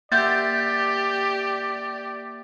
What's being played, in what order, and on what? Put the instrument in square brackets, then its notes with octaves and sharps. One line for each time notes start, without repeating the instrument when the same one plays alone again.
[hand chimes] A#3 E5 F#5 [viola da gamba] G4 [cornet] D5 [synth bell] G6 A6